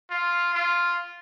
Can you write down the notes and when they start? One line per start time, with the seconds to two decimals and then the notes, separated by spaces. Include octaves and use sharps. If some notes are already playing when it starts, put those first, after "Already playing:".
0.11 F4
0.54 F4